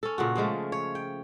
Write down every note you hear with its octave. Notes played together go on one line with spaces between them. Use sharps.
C#4 A4
A#2 C#3 F#4
C#3 F3 G#3 A3
C#5
G5